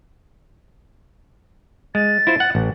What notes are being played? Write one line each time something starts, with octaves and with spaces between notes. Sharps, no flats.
G#3 A6
E4 F4 C5
F#5
A1